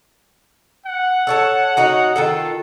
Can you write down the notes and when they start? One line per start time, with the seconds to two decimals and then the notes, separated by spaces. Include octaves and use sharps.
0.86 F#5
1.27 A4 C#5 A5
1.77 C#4 D#4 F#4
2.16 D#3 F4 A4